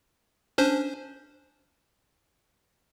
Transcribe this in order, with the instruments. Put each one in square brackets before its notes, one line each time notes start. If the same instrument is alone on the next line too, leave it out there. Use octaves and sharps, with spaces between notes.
[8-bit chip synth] C#4 D4 C5